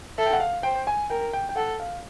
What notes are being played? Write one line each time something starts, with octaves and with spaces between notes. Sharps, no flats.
A4 E5
G5
F#5
F5
C5 G5
G#5
A#4 G5
G5
G5
A4 F#5
F5